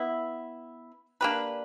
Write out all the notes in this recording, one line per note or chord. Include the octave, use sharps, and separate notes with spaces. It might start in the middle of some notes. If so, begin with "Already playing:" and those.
Already playing: B3 E4
A#3 D4 G4 B4